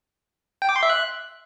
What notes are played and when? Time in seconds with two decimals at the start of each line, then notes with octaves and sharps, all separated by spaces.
0.62 G5
0.69 D6
0.76 C6
0.83 E5
0.90 F#6